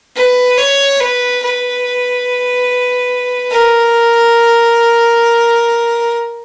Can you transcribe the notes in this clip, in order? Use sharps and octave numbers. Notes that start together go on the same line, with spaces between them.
B4
C#5
B4
B4
A#4